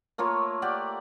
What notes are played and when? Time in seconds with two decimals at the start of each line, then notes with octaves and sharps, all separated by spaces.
0.18 A3 A#3 F4 C#5
0.62 G4 D5 F#5